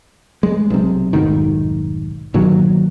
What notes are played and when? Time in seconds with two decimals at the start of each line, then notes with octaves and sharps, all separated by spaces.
0.43 G#3
0.70 B1 C3
1.13 F1 B1 G#2 D#3
2.34 G1 A#2 D#3 F#3